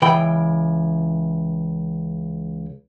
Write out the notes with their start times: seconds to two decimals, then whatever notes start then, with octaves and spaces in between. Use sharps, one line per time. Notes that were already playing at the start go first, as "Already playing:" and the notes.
0.02 C#2 E3 G5 B5